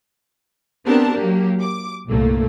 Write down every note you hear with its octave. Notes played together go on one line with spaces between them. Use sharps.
B3 C4 D4 G4 A#4 A5
F#3 A#3 G4
D6
C2 G2 A#2 A3 A#3